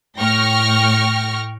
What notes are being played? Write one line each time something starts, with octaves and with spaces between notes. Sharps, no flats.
A2 G5 C#6 F6 A#6